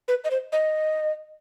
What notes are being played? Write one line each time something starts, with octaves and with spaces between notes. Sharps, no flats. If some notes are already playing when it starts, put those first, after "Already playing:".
B4
D#5
C5
D#5